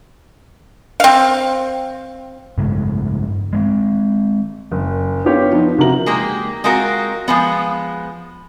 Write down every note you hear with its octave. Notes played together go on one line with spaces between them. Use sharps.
C4 F5
G2 C#3 G#3 A3
G#3 A3 C4
F#1
B3 D4 D#4 F4 G4 C#5
F3 B3 D4 D#4
C3 F3 F#4 A#4 A#5 F#7
G#3 A#3 G4
G#3 C4 F4 F#4 A#4
F3 G#3 B3